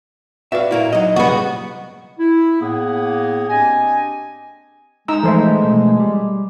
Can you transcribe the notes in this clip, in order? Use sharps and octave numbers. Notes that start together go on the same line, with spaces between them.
F#4 B4 D5 E5 F5
A#2 A#3 E4
F#3 D#4 D#5
A#2 C#3 G3 B3 F#4
E4
A2 A#3 B3 G#4
C4 D4 G4 D#5 G#5
G#3 D#4 A#5 E6
E3 F3 A3 A4 C5 E5
B2 F3 A3
G3